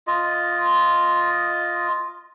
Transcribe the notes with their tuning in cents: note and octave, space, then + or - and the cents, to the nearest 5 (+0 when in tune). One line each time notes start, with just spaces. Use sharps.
F4 +0 D#5 +0